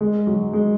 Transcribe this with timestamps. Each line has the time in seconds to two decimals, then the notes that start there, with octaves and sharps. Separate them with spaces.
0.01 G#3
0.27 F#3
0.53 G#3